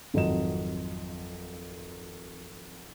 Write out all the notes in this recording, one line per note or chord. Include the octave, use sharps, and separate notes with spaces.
G#1 F2 F#3 D#5 E7